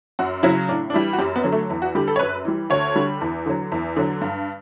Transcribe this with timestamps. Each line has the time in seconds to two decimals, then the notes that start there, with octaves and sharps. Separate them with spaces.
0.19 F#2 F#4
0.43 C#3 F#3 E4
0.69 A2 D4
0.90 D4
0.93 E3 G3 E4
1.13 F#4
1.19 F#2 G4
1.36 B3
1.44 D3 F#3
1.52 A3
1.70 E2
1.82 F#4
1.95 D3 G3 G4
2.08 A4
2.16 C#5
2.19 F#2 B4
2.45 E3 G3
2.70 D2 C#5
2.96 D3 G3
3.21 E2
3.46 D3 F#3
3.72 E2
3.96 D3 F#3
4.21 G2